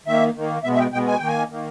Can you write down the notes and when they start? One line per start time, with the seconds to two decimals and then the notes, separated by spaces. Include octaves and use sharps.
0.06 D#3 A#3 E5
0.35 D#3 A#3
0.64 B2 G#3 B3 E5
0.74 E5
0.79 G5
0.93 B2 G#3 B3 G5
1.07 G#5
1.18 D#3 A#3 G5
1.28 G#5
1.50 D#3 A#3